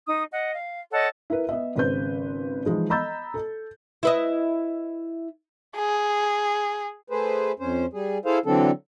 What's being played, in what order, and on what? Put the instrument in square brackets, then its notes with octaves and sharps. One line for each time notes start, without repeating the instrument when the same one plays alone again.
[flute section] D#4 D#6
D#5 F#5
F5
A4 C#5 D#5 F#5
[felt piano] E4 A#4 B4
B3 D#5 E5
G#1 C#3 B4 C5 G6
E3 F3 G#3 D#4
D#5 A#5 B5 E6 G6 A6
A4
[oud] E4 B4 D#5
[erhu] G#4
[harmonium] A3 G#4 B4 C5
F2 C#4 C5
G3 G#4
E4 G#4 A4 C5 F5
D3 E3 F#3 C4 D4 A4